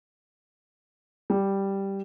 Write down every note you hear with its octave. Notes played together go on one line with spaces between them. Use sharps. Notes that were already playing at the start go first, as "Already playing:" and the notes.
G3